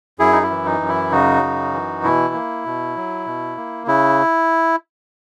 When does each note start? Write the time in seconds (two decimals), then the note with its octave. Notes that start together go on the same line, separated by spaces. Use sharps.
0.19 F#2 E4 G#4
0.32 D#4
0.43 E4
0.50 E3
0.66 D#4
0.81 F#2
0.88 E4
1.12 C#3 D#4 F#4
1.43 F#2
1.73 E3
2.04 B2 E4
2.34 A#3
2.65 B2
2.96 F#3
3.26 B2
3.57 A#3
3.87 C#3 E4